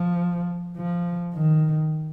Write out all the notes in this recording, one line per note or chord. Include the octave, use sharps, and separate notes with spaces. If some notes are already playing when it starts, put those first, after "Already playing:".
Already playing: F3
F3
D#3